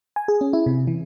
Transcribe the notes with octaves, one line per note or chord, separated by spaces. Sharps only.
G#5
G#4
C#4
E4
C3
E3